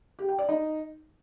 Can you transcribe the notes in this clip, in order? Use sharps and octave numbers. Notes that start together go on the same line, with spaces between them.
G4
G5
D5
D#4